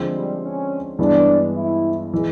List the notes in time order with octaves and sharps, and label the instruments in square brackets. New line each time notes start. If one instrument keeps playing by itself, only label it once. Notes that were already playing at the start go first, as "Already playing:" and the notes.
Already playing: [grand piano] D3 F3 G#3 C4
[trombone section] G3
C#4
[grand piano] G2 E3 G#3 B3 [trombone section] D4
[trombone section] E4
[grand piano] E3 G#3